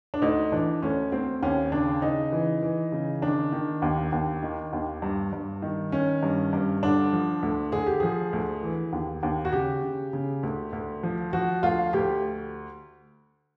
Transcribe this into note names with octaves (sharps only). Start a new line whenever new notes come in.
D4
D2 D#4
E3 D4
D2 C#4
D2 C4
D#2 C#4
C#3 D4
C#3 D#4
E3
E3
C#3
D#3 D4
D#3
D#2
D#2
D#3
D#2
G2
G2
D#3
D#3 C#4
G2
G2
D3 D4
F3
D2
D3 G#4
G4
F3 G#4
D2
E3
D#2
D#2
F#4
C#3 G4
C#3
C#3
D2
D2
F3
F3 F#4
D2 F4
D2 G4